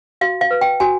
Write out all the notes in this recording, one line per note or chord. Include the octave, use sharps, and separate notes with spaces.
F#4 F5
F5
B4
G5
F#4 G#5